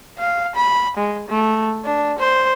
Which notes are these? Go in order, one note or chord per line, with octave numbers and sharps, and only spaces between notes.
F5
B5
G#3
A3
D4
C5